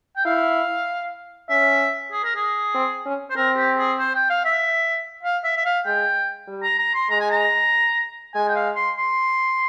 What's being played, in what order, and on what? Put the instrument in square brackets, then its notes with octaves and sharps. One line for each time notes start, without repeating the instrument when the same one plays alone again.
[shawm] G5
[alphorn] E4 [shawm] F5
[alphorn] C#4 [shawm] E5
[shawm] G#4
A#4
G#4
[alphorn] C4
C#4
[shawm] C5
[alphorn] C4 [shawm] A#4
[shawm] G4
G#4
C5
G5
F5
E5
F5
E5
E5
F5
[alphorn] G#3 [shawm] G5
[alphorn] G3
[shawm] A#5
A#5
C6
[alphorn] G#3 [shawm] A#5
[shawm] G#5
A#5
[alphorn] G#3 [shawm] G#5
[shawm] G5
F5
C6
C6